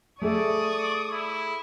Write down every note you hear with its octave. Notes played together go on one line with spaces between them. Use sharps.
A3 G#4 D5 E5 C#6 D#6
E4